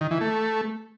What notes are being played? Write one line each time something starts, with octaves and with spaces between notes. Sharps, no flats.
D#3
E3
A3